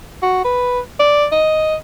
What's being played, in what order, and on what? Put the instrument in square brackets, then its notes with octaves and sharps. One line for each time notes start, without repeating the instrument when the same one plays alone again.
[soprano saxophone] F#4
B4
D5
D#5